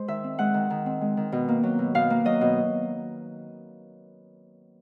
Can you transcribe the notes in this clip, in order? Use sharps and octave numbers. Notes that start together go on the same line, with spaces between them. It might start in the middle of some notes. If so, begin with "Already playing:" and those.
Already playing: G#3 C5
D#3 E5
C4
G#3 F#5
D#3
D#3
C4
G#3
D#3
B2
A#3
F#3
B2
B2 F5
A#3
F#3 D#5
B2